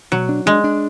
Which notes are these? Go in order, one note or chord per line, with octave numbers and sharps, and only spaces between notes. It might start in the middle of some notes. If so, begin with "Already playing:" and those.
B2 F#3
D4
G#3 D4
D4